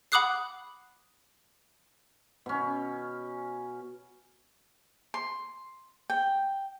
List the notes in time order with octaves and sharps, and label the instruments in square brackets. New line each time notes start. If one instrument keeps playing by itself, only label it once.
[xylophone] F#5 B5 D6 D#6 F#6 C7
[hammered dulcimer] B2 C#4
[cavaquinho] C6
G5